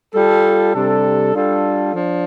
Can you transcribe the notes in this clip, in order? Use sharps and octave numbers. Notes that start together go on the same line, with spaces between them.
G3 F4 A4
C3 G3 D4 A4
G3 D4 F4 A4
F3 D4